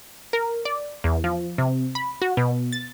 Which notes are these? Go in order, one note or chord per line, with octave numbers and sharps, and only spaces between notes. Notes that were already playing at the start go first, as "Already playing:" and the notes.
A#4
D5
E2
F3
C3
B5
F#4
B2
A6